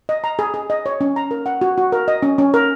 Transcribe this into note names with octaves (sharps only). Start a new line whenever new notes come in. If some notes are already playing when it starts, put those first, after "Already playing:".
D#5
A#5
G#4
G#4
D#5
C#5
C#4
A#5
A#4
F#5
F#4
F#4
A#4
D#5
C#4
C#4
A#4